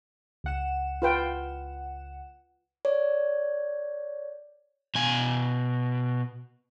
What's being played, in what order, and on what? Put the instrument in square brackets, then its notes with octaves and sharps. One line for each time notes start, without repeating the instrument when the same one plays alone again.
[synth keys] C#2 F#5 E7
[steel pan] F4 B4 G5
[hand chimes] C#5 D5
[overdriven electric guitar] B2 G#5